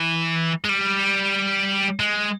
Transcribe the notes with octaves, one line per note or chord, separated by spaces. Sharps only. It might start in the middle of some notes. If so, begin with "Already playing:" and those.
Already playing: E3
G#3
G3
G#3